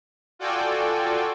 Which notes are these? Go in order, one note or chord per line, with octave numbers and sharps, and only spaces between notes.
F4 F#4 A4 D5 G5 G#5